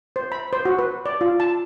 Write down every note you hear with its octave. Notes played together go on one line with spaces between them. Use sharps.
C5
B5
C5
F#4
B4
D5
F4
A5